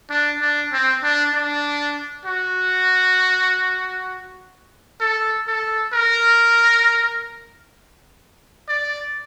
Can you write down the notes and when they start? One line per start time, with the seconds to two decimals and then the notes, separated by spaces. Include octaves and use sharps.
0.10 D4
0.41 D4
0.72 C4
1.03 D4
1.34 D4
2.26 F#4
5.01 A4
5.47 A4
5.93 A#4
8.69 D5